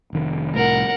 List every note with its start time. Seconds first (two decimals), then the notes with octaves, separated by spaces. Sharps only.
0.13 F1 D#3
0.55 C2 A2 A#4 F#5